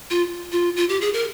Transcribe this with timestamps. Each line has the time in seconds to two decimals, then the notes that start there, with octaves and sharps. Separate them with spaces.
0.10 F4
0.52 F4
0.76 F4
0.89 G4
1.01 G#4
1.14 A#4